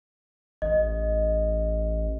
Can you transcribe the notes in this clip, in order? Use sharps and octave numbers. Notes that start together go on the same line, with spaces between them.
A1 D#5